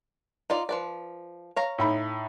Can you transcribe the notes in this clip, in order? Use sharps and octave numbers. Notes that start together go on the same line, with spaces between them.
D#4 F4 D5
F3 B4 D5
C#5 F5 A#5
A2 D#4 B5